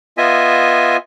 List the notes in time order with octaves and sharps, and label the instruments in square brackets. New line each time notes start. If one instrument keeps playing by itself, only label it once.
[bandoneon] B3 F4 D#5 E5 G#5